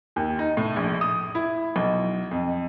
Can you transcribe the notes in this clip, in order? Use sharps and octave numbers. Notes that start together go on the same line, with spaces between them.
D#2
D#4
A2
A#1
D#6
E4
B1
F2